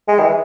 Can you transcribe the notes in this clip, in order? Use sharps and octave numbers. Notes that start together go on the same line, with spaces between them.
G#3
D#3
E3